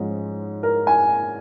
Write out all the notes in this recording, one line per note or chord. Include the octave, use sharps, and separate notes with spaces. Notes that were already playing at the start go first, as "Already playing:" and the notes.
Already playing: G#2 F3 G#3 C#4
A#4
G#5